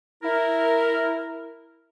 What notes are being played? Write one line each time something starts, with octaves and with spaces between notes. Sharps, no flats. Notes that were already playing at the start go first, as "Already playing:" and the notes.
E4 A#4